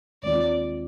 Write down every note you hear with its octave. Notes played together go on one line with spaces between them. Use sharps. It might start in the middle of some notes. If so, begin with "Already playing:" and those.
D#2 D#3 G#3 C4 F4 D5